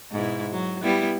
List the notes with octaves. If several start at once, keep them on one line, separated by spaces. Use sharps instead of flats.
G#2 B2 E4
F#3
G3 B3 E4